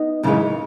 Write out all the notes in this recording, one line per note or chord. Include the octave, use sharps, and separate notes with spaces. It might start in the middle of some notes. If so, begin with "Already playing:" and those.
Already playing: B3 D#4
F#2 C#3 E3 G#3